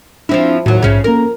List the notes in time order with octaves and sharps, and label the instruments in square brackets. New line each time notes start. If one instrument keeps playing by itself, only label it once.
[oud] F3 C4 E4 [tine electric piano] D4
[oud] D#2 F#3 [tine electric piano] A2 F#4
[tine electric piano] A#1 G#2 E5 [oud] C#3 C#4
[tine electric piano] A#3 C#4 A4 [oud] A#4